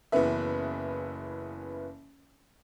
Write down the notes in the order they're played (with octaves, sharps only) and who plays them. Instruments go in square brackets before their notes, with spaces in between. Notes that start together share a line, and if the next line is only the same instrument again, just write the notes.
[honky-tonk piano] F#1 C#3 E3 B3 B4 E5